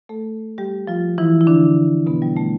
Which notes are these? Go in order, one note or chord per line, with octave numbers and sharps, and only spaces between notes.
A3 A4
G3 G4
F3 F4
E3 E4
E4
D3 D4
B2 B3
G3
A3